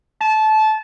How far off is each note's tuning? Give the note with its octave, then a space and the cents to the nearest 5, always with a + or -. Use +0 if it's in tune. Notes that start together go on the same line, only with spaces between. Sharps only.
A5 -20